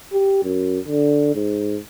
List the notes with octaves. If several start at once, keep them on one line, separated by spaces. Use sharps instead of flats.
G4
F#2
D3
G#2